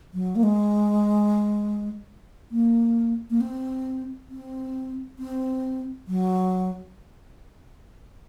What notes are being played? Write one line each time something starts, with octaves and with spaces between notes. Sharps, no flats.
F#3
A#3
G#3
A#3
A#3
C4
C4
C4
F#3